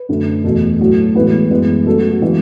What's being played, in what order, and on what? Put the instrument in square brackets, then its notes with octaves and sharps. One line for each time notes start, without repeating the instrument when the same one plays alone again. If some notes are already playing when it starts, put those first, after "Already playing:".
Already playing: [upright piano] B4
F#2 D3 A3
E2 B2 A3 A4
A2 F#3 A3
A2 E3 G#3 B3 B4
F#2 E3 G#3 B3
C#3 F#3 A3 A4
F#4
F#4
C#3 E3 G#3 B3